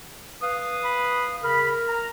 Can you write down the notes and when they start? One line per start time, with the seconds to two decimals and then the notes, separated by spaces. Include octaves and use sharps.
0.42 B4 F5 D#6
0.84 B5
1.44 C#3 A#4 B5
1.88 A#5